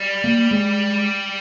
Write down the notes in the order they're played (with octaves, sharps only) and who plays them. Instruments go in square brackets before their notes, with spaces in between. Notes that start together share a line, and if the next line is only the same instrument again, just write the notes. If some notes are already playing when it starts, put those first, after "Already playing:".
Already playing: [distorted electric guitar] G3
[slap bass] A#3
G#3